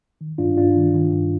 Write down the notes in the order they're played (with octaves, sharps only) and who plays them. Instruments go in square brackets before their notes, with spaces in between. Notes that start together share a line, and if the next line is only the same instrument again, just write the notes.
[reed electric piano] D#3
G2 D4 F4
G2 D4 F4
D#3
D#3
G2